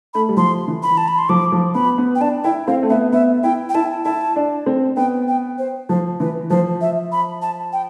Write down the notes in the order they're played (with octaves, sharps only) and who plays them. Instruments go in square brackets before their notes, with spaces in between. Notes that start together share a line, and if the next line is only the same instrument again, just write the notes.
[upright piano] A3 [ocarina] B5
[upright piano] G3
[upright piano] F3 [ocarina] C6
[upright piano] E3
[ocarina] B5
A5
B5
C6
[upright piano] F3 [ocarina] D6
[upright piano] F3
[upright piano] B3 [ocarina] B5
[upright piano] B3
[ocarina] G5
[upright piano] D4 [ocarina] A5
[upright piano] E4 [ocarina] G5
[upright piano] C4 [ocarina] F5
[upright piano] A3
[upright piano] B3 [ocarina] E5
[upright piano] B3 [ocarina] E5
[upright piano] E4 [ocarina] G5
[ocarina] G5
[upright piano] E4 [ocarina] A5
[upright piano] E4 [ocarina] A5
[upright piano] D4
C4
[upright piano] B3 [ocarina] G5
[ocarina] G5
C5
[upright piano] F3 [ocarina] C5
[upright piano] E3 [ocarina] B4
[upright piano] F3 [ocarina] C5
[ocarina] E5
B5
A5
G5